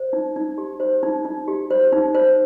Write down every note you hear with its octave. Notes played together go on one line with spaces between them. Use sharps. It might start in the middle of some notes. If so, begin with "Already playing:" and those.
Already playing: C5
D#4
D#4
G4
C5
D#4
D#4
G4
C5
D#4
C5